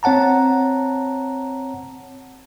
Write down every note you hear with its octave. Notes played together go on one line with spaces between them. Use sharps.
C4 C#5 F#5 A5 A#5